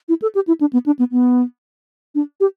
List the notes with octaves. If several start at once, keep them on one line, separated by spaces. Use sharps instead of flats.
E4
A4
G4
E4
D4
B3
D4
B3
B3
D4
G4